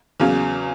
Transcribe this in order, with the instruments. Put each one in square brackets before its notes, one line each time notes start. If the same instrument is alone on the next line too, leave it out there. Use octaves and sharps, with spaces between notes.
[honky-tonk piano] E2 C#3 F#3 A#3 C#4